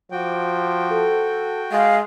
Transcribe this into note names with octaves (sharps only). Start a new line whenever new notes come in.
F3 F#4 G5 D6
A4
G#3 F5